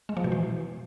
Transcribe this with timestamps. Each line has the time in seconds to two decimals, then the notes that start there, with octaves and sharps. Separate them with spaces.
0.09 G#3
0.17 F3
0.24 B2
0.32 E3